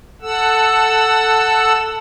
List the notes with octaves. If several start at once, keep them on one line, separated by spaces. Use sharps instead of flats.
A4 F#5 E6